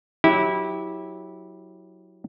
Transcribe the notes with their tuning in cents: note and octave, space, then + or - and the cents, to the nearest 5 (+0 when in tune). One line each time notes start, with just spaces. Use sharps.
F#3 -5 E4 -20 G4 +0